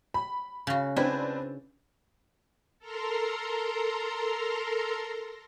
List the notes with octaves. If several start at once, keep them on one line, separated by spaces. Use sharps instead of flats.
B5
C#3 F#4
C4 D4 E4 B4
A4 A#4 A#5 C6